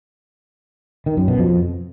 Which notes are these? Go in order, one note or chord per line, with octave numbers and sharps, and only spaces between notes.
D#3
F#2
B2
F2